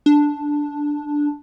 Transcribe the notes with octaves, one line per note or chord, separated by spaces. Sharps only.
D4